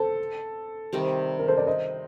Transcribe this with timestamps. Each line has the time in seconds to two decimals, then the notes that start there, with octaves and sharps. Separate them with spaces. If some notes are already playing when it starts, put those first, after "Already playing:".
Already playing: C4 A4
0.93 C3 D#3 G3
1.39 A#4
1.48 A4 C5
1.57 A#4 D5
1.67 C5 D#5